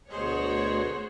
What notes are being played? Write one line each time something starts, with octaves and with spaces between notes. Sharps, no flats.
D2 B2 A3 G#4 C5 C#5 D#5 F#5